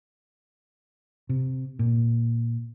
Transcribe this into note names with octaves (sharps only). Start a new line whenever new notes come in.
C3
A#2